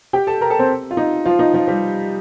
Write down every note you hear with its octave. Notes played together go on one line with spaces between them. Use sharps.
G4 G5
A4 A5
A#4 A#5
A4 A5
C4 C5
F4
D#4
F3 F4
D#4
F3 F4
G3 G4